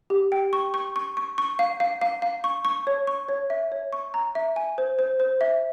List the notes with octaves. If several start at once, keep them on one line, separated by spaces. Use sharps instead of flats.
G4
G5
C#6
C#6
C#6
C#6
C#6
F5
F5
F5
F5
C#6
C#6
C#5
C#6
C#5
E5
C#5
C#6
A#5
E5
G#5
C5
C5
C5
E5